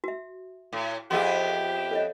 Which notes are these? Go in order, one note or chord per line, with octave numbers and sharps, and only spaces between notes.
F#4 E5
A2
F2 B3 G4 G#4 D#5 E5 C6
A4 C#5 D#5